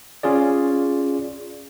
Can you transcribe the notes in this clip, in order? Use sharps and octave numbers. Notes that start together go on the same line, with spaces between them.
C#4 F4 G#4 D5